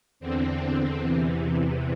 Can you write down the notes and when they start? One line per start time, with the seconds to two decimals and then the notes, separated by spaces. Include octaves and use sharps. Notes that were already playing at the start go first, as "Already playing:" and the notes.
0.20 E2 D3 C4
0.98 E2 C3 E3